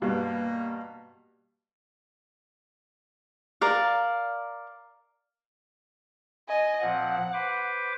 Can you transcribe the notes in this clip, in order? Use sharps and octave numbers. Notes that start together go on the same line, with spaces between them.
G2 B2 G3 A#3
A#4 D5 F5
D#5 G#5
A#2 F3 C4 F#5
B4 C5 D6